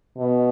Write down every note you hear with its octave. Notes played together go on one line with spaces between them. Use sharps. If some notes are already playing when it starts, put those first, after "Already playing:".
B2